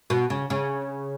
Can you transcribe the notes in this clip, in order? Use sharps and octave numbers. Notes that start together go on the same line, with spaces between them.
B2
C#3
C#3